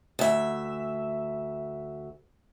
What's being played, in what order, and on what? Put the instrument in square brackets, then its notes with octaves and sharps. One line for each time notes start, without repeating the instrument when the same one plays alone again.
[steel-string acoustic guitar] D2 E5